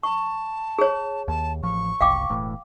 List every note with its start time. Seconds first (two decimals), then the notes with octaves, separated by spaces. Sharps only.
0.03 A5 C#6
0.79 G#4 C#5
1.28 D#2 A5
1.63 A1 F3 C#6
2.01 F#1 C2 F5 G5 D6
2.29 E1 E2 A2